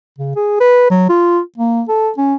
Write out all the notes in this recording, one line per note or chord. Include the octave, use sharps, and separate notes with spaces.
C#3
G#4
B4
F#3
F4
A#3
A4
C#4